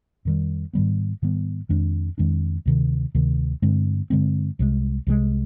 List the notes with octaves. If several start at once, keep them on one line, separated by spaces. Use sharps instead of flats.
F2 D#3 G3
G#2 D#3 G3 B3
G#2 D#3 G3 B3
F2 D#3 G#3 D4
F2 D#3 G#3 D4
D2 C3 D#3
D2 C3 D#3
G2 D3 G#3 C4
G2 D3 G#3 C4
C2 C3 F3 G#3
C2 C3 F3 G#3